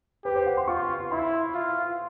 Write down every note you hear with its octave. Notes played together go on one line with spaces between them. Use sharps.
G4 B4
C5
F#5
C6
F4 C#6
E4 C6
F4